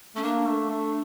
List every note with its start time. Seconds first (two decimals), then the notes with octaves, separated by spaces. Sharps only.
0.15 A3 C#4
0.23 A#3 D4
0.46 A3
0.70 A3